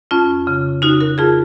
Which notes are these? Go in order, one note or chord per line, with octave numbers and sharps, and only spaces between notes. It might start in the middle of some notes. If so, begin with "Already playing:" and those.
F2 C#4 F4
C#3
C#3 D#4 F#4
F#4 A#4
F2 F4 G#4